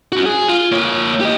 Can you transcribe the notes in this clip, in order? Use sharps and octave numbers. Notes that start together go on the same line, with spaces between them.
C#4 F#4
G#4
F4
A#3 C#5
G4 D#5